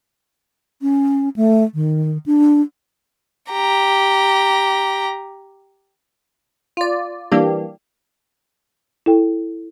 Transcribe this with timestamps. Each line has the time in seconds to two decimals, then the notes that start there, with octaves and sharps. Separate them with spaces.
0.82 C#4
1.36 A3
1.74 D#3
2.26 D4
3.52 G4 A#5
6.77 F4 D5
7.32 E3 G3 A#3 D4 G4
9.06 E4 A4 G5